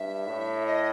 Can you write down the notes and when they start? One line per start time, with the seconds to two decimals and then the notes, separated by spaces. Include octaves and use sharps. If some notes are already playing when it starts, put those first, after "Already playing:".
Already playing: G2 E5
0.27 A2
0.66 D#5